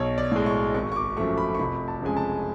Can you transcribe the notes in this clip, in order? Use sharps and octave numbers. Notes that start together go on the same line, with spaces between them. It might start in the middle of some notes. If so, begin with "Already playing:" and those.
Already playing: B1 C#5
D5
A2 G#3
C#6
G#1 C#6
C#6
D6
F#2 F3 A3 C#6
B5
C#6
F1 B5
A5
F2 C#3 F3 G#3 G#5
A5